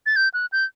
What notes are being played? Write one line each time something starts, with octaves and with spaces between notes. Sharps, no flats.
A6
G6
F#6
G6